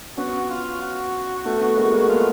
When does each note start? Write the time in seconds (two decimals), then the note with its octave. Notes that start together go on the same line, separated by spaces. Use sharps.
0.17 B3 C#4 F#4
0.50 F4
0.81 F#4
1.45 A3 B3
1.61 A3 B3
1.77 G#3 A#3
1.88 B3
1.93 G#3 A#3
2.09 A3 B3 F4